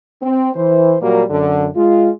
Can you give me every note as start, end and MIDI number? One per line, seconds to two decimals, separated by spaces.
0.23 0.50 60
0.55 0.96 52
0.55 0.96 72
1.01 1.23 46
1.01 1.23 54
1.01 1.23 55
1.01 1.23 58
1.01 1.23 66
1.01 1.23 70
1.30 1.68 42
1.30 1.68 50
1.76 2.10 56
1.76 2.10 65